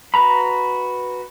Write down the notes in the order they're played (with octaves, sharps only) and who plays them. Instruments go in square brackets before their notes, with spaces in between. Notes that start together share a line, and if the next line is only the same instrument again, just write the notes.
[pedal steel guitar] F#4 B4 A#5 B5